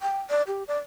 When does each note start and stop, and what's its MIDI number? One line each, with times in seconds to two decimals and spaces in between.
0.02 0.19 79
0.30 0.43 74
0.47 0.63 67
0.68 0.78 74